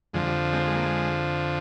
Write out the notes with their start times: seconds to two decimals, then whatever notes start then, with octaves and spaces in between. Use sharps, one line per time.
0.14 F2 D3 F3 G#3
0.27 G3
0.53 G#3 C4
0.66 G#3
0.75 A#3
0.84 G#3